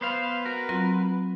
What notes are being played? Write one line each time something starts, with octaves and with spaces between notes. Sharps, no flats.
B3 B4 C5 F5
F#4 A#4
F#3 C4 F4